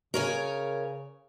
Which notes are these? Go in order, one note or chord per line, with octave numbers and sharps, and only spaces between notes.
C#3 A#4 C#5 G#5